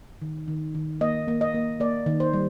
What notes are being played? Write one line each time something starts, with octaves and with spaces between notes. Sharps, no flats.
D#3
D#3
D#3
A#3 D#5
A#3
D#5
A#3
A#3 D5
D#3
C5
G3